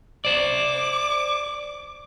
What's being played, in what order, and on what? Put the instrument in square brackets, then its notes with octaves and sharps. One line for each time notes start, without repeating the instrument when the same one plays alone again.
[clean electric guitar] C5 D5 [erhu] D6